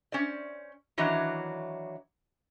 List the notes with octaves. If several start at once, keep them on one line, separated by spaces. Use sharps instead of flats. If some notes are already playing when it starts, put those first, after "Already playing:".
C#4 C5 D5
D#3 E3 F#3 C#4 D4